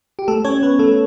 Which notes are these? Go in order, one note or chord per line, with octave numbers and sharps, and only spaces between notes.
G4
A3 A4
C#4 C#5
B3 B4
A3 A4